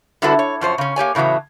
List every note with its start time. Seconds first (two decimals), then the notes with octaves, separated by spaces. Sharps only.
0.22 D3 G3 E4 F#4 A4 B4
0.39 C#5
0.61 F#2 F3 C5 C#5
0.78 C#3 C#4
0.96 A#3 G4 C#5 G#5
1.15 A2 C#3 E3 F#3 B3